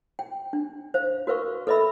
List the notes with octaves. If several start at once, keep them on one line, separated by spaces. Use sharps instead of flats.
G5
D4
C5 F5
F#4 A#4 B4 F5 C#6
A4 B4 D#5 E5 B5 E6